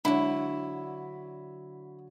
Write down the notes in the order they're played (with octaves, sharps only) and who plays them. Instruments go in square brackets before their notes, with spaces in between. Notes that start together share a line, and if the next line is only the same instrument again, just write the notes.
[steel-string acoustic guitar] D3 F#3 [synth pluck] G#3 D4 [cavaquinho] E4